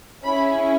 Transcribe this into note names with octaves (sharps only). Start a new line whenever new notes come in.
C#4 E4 G#4 B5